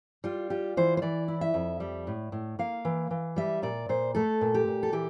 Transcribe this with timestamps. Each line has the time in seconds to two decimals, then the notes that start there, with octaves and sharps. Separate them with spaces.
0.24 G3 F4
0.50 F4 G4
0.77 E3 C5
0.97 C5
1.02 E3 D5
1.28 E4
1.41 E5
1.54 F2
1.80 G3
2.07 A2
2.32 A2
2.59 A#3 F5
2.85 E3
3.11 E3
3.36 G3 E5
3.62 A#2 D5
3.89 A#2 C5
4.15 A3 A4
4.41 A#2
4.54 G4
4.68 A#2
4.83 A4
4.93 E3 G4